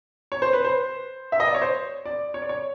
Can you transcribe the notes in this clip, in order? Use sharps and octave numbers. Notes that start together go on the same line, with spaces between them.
C#5
C5
B4
C5
E5
D#5
D5
C#5
C5
D5
C#5
D5
C#5